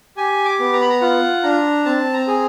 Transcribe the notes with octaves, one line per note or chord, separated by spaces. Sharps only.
G4 G#5
D6
B3
A#5
B5
A#5
F4 F#5
D4 A#5
C4 A5
A#5
G#4